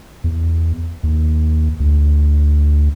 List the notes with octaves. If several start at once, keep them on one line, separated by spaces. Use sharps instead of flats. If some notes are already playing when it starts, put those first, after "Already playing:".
E2
D#2
D2